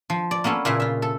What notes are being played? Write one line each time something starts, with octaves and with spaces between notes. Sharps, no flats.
F3
D5
A#3 B3 C#4 A4
A#2 C#3 E4 E5
F4 E5
A4